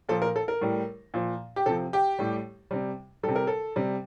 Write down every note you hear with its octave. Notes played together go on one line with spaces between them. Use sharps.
A#2 F3 A4
A#4
A4
A#4
A2 G3
A#2 F3
G4
C3 F3 A4
G4
A2 G3
C3 G3
C3 G3 A4
A#4
A4
C3 G3